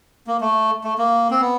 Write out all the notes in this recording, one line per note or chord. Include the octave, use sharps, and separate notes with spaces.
A#3
A3
A3
A#3
C4
B3